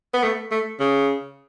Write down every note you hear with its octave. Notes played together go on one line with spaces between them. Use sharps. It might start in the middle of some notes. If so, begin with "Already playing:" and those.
B3
A3
A3
C#3